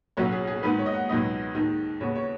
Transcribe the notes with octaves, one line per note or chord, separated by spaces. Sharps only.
B1 B2 F#3 C#4 C#5
G#4
G#4
G#2 D#3 B3 B4
C#5
D#5
F#5
C#2 B2 F#3 B3 D#4 D#5
D#2 D#3 G#3 D#4
D#2 C#3 B3 C#5
C#5